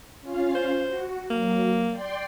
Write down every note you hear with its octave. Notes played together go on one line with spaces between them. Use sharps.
C#4 F4 F5
C5
F#4
F#3 A#3
D5 G5 C6